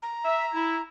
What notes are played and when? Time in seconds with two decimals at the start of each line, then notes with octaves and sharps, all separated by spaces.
0.02 A#5
0.25 E5
0.53 E4